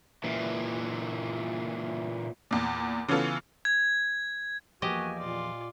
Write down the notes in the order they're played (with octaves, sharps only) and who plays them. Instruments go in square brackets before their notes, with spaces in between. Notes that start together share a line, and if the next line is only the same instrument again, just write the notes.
[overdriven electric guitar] A#2 E3
[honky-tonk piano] E2 A#2
C#3 E3 B3 C#4 F4 A4
[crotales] G#6
[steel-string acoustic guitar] E2 F3 [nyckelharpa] A#3 G#5 [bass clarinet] F#4 [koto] G4 D#5
[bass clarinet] A#2 [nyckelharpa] F4 D5